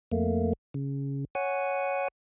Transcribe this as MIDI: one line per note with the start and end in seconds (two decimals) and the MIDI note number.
0.12 0.53 41
0.12 0.53 57
0.12 0.53 58
0.74 1.25 49
1.35 2.08 73
1.35 2.08 78
1.35 2.08 80